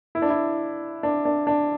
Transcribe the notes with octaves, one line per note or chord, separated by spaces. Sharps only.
E4
D4
E4
D4
D4
D4